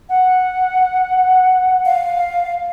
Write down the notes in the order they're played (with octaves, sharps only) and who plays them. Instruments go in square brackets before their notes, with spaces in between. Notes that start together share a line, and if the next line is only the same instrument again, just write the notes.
[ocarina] F#5
[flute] F5